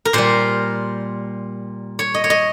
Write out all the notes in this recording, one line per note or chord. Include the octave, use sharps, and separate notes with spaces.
A#4
A#2 G3 C5
C#5
D#5
C#5
D#5